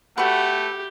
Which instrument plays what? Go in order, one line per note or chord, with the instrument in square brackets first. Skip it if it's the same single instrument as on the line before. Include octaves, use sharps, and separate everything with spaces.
[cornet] A3 [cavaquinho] F#4 B4 [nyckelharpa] G4 [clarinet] F#5